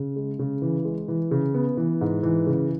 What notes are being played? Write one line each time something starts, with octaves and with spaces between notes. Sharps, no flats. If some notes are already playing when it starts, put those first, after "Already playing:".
Already playing: C#3
G#3
C#3
E3
G#3
E3
C#3
B3
E3
G#2
E3
C#3